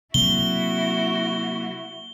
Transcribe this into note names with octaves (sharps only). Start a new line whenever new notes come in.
C3 F#3 A#3 E4 F#4 G7